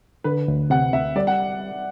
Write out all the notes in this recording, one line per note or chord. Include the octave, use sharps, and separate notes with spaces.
D3 B4
D2
C3 F#5
D2 E5
G3 D5
F#5